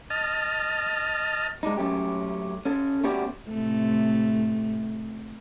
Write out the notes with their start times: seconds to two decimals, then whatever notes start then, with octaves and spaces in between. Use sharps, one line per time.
0.10 D#5 A5 F6
1.63 G#3 D4 D#4
1.77 F#2 A3 C#4 G4
2.65 C#4 A4
3.04 A3 B3 C#4 F#4 G4 D5
3.48 A2 C3 A3